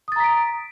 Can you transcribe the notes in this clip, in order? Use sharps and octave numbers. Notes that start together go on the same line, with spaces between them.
A#5 D#6 A6 B6 D7